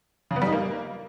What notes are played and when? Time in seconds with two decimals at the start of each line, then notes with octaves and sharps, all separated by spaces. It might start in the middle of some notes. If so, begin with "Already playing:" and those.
0.31 C#3
0.36 B3
0.42 G3
0.47 D#4
0.53 A#3